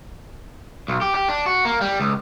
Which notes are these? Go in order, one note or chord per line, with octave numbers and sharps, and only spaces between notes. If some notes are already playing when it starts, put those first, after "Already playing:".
B1
G4
G4
D4
F#4
A#3
G3
C#2